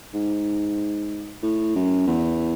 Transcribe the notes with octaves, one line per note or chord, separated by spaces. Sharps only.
G#2
A2
F#2
E2